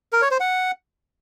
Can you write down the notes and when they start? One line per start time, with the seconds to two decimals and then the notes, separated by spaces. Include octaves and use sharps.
0.13 A#4
0.22 C#5
0.31 C5
0.40 F#5